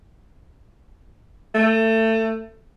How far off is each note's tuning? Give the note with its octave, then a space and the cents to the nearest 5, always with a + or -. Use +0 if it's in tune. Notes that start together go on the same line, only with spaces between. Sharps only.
A3 +25